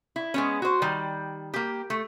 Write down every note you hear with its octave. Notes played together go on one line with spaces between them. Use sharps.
E4
G#3 B3 C#4
F#4 C5
D#3 G3
A#3 G4
A3